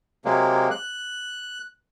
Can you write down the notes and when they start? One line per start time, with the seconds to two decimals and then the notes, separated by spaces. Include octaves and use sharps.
0.25 C3 F#3 G#3 A#3
0.71 F#6